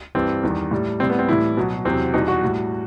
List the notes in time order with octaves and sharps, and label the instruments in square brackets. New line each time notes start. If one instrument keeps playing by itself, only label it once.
[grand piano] G2 E3 G3 C4
E2 D#3 G3
A2 G3
A2 G3 C4
B3
C4
A2 E3 G3 E4
B2 F#3
E2 C3 F#3 C4
E2 B2 G3 D#4
F#4
A2 G3